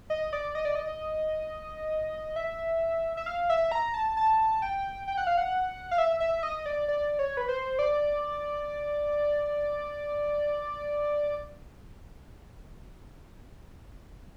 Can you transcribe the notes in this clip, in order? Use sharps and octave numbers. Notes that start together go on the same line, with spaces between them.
D#5
D5
D#5
D5
D#5
E5
E5
F5
E5
A#5
A5
A5
G5
G5
F#5
F5
F#5
F5
E5
E5
D#5
D5
D5
C#5
B4
C5
D5